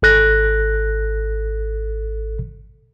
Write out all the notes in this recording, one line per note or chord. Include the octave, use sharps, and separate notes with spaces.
G#1 A4 F#6 A#6